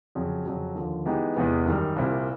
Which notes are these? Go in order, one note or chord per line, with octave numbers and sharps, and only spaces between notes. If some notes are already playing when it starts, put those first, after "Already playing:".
F2 C#3 F#3
F2 C#3 F#3
D#2 D3 F3
E3 G#3 B3 D#4 G4
E2 C3 E3 G#3 B3
F#2 D#3 G3
C2 A#2 G3 C4 E4